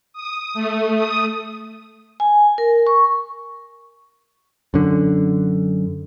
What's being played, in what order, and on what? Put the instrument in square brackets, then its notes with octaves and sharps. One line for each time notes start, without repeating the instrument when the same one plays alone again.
[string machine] D#6
A3
D#6
[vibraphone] G#5
A#4
C#6
[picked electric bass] F#2 D3